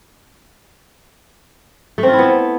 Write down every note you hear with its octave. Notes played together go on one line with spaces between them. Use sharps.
A3
C4
F4
E4
B3